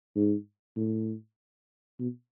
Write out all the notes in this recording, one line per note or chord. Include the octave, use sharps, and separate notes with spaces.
G#2
A2
B2